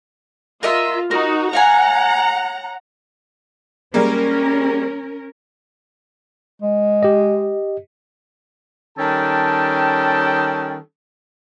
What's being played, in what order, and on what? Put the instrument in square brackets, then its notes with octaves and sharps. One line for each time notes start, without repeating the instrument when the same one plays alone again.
[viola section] F4 [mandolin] A#4 D#5 E5
[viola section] D#4 F#4 [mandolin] A#4
[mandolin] C#5 F5 G#5 [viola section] F#5 A#5
[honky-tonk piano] G3 G#3 A#3 [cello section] C#4 A#4
[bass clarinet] G#3
[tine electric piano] G4 D#5
[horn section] D#3 G3 C#4 A4 G5 A5